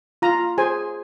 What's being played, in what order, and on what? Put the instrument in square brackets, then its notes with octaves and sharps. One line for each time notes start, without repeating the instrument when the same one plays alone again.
[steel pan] F4 A#5
G#4 C5 G#5